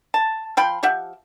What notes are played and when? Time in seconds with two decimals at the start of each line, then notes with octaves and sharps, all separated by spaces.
0.14 A5
0.57 F3 G5 B5 C6
0.83 F3 G4 E5 F#5